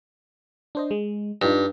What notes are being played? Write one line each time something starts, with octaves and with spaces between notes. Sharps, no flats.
D4 C5 D#5
G#3
G2 D#4 F4 G4